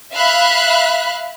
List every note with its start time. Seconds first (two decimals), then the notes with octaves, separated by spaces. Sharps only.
0.14 E5 F5 B5 F#6